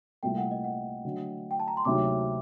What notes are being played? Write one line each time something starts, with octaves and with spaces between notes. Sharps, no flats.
C2 A#2 A3 G5
F#5
D#5
F#5
D3 F#3 A3
G5
A5
A#5
C6
D2 C3 D#3 F#3 A#3 D6